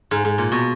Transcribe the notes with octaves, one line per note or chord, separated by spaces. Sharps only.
G#2
G#2
A#2
B2